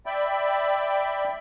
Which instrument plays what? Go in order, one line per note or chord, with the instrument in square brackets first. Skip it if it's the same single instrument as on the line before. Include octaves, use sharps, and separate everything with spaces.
[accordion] D5 E5 G5 B5